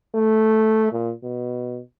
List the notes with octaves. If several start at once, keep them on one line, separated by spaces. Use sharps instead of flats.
A3
A#2
B2